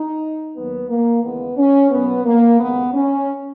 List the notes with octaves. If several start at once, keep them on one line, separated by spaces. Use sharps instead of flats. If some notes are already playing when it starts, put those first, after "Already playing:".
Already playing: D#4
D#2 D#3 F#3 B3
A#3
D#2 C#3 E3 G#3 B3
C#4
B1 A#2 F#3 B3
A#3
D#2 C#3 G#3 B3
C#4